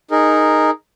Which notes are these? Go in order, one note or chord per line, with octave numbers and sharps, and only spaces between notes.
D#4 G#4 A#4